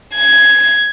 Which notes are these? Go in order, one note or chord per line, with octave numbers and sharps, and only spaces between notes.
G#6